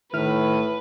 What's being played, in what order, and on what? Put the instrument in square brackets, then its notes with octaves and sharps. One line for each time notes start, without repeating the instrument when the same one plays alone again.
[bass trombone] A2 [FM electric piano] D#3 E4 F6 [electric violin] B4